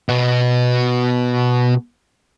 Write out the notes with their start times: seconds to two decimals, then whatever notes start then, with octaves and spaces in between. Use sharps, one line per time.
0.09 B2 B3